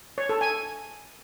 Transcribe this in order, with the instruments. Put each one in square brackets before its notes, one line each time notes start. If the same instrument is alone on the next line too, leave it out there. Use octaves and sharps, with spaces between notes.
[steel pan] C#5
A4
G#5